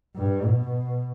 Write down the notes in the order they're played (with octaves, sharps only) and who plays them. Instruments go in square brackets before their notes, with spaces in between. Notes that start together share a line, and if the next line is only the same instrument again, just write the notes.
[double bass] G2
B2